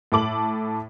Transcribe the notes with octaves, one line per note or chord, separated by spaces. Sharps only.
A2 A4 D6 F#7